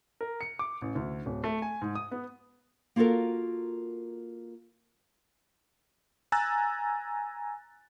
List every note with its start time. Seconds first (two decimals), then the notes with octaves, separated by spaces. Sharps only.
0.21 A#4
0.41 C#7
0.59 D6
0.82 A1
0.95 D2
1.26 D1
1.44 A3
1.62 G#5
1.81 G#2
1.95 D#6
2.11 B3
2.96 A#3 F4 F#4 A4 A#4
6.32 G#5 A#5 E6 F#6 A6